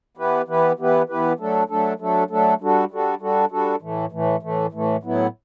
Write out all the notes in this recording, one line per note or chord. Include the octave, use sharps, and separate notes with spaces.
E3 B3 E4 G4 B4
E3 B3 E4 G4 B4
E3 B3 E4 G4 B4
E3 B3 E4 G4 B4
F#3 A3 D4 A4
F#3 A3 D4 A4
F#3 A3 D4 A4
F#3 A3 D4 A4
G3 D4 F#4 A4
G3 D4 F#4 A4
G3 D4 F#4 A4
G3 D4 F#4 A4
A2 E3 A3
A2 E3 A3
A2 E3 A3
A2 E3 A3
A2 F#3 B3 E4